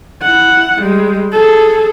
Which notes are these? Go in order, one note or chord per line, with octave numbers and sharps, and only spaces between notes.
E4 F#5
G3 G#3
G#4 A4